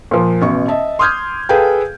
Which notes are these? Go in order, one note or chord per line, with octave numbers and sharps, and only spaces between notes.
A#2 F3
A1 B2 C#6
D#5 E5 A5
C6 D6 D#6 F6 G6 G#6
G#4 A4 B4 F5 G5